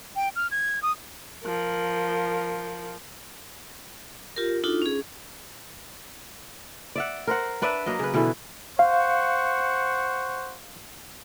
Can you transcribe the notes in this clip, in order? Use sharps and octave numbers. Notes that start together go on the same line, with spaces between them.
G5
F6
G#6
D#6
F3 A#4
F4 G4 A#4
D4 D#4 F4 F#4 A4
C#4 G#4
D5 E5 F#5
A#4 C5 F#5
D4 B4 D5 E5
F#3 A#3 D#5
C#3 B4
B2 D3 E3 E4
C5 F5 F#5 C#6